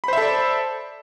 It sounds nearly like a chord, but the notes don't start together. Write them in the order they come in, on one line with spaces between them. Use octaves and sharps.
B5 C5 E5 A4 D5